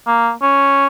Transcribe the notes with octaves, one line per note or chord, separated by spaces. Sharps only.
A#3
C#4